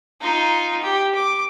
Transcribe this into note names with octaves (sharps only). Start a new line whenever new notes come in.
D#4 F4
G4
D6